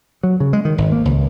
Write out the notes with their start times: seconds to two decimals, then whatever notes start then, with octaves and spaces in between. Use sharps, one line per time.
0.23 F#3
0.40 C#3
0.53 G#3
0.65 D#3
0.78 G#1
0.92 A#3
1.05 C#2